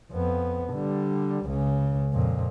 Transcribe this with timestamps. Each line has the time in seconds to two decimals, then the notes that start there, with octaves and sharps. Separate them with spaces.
0.12 F2 B3
0.74 D3 G3
1.45 C#2 C#3
2.13 F2 A#2